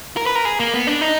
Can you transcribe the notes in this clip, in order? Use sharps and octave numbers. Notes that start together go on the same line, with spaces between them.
A#4
B4
A#4
G#4
A#3
B3
D4
D#4